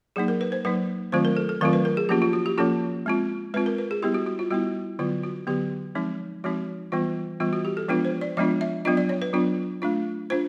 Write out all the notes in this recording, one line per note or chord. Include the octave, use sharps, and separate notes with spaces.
F#3 A#3 D#4 G#4
A#4
B4
C5
F#3 A#3 D#4 B4
D#3 F#3 A3 C4 F4 C5
A#4
A4
A4
D#3 F#3 A3 C4 F4 A#4
B4
A#4
G#4
F3 A#3 C#4 F4 G4
F4
F#4
G4
F3 A#3 C#4 F4 A4
G#3 C4 F4
G#3 C4 F4 B4
A#4
B4
G#4
G3 B3 E4 G4
F#4
F#4
F4
G3 B3 E4 F#4
D3 F#3 B3 F4
F#4
D3 F#3 B3 G4
F3 G#3 C4 D#4
F3 G#3 C4 D#4 F#4
E3 G3 B3 F4
E3 G3 B3 F4
F#4
G4
A4
F3 G#3 B3 D4 F4 B4
C5
D5
F3 G#3 B3 D4 F4 D#5
E5
F#3 B3 D4 F4 D#5
D5
C#5
B4
F#3 B3 D4 F4
A3 D4 F4
D4 F4 C5